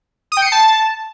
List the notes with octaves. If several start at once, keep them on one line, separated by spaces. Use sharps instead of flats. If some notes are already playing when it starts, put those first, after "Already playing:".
D#6
G5
C#7
C7
A5